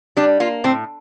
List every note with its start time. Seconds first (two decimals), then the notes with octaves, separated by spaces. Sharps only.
0.17 G3 D4
0.40 A#3 F4
0.64 A2 C4